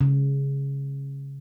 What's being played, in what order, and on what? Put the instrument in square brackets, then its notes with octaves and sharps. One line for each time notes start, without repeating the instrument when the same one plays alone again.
[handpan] C#3